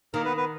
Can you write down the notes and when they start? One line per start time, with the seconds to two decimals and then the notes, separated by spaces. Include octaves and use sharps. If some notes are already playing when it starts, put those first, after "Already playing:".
0.14 D#3 A#3 A#4
0.25 B3 B4
0.37 B3 B4